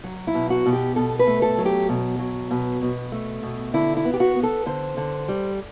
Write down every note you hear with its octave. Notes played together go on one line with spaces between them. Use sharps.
F#3
E4
B2
F#4
B2
G4
B2 A4
B4
A3
A4
F#3
G4
B2
F#3
B2
B2
A3
B2
D3 E4
E4
B3
G4
F#4
B3
A4
D3 C5
D3
G3